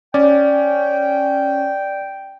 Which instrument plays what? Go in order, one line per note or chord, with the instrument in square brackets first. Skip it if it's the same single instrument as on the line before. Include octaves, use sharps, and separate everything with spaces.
[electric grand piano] C#4 [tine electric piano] D5 [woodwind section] G5